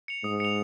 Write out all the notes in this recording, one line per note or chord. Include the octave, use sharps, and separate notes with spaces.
C#7 F7
G#2 D#6
C#7 F7